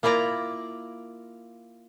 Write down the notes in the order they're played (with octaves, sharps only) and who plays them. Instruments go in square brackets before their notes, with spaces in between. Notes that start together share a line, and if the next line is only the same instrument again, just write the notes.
[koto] A#3 E4 F4 D5 A#5